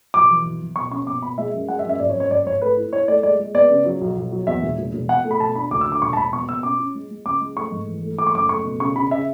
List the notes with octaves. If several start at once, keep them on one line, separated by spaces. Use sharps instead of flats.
B1 D6
E3
B1
B1
B2 C#6
C#4 C#6
B2 D6
B2 B5
G#3 E5
F#2
G#3 F#5
E5
F#2
E5
G#1 D5
C#5
F#2
C#5
G#1 D5
G#1 C#5
A3 B4
E4
E4 C#5
A3 D5
G#3 D5
G#3
B3 D5
C#3
F#3
B1
B1
F#3
E2 E5
E1
E1
E1
B2 F#5
A3
B5
B2 A5
D4 B5
D2 D6
E6
D3
D6
E1 C#6
A5
E1 B5
B2 C#6
B2 E6
C#4 D6
C#4
G#3
G#3
C#2 D6
G#3
A3 C#6
G#2
E3
A3
A3 D6
C#6
F#1 D6
A3 C#6
B2
C#3 C#6
C#3 B5
C#3 E5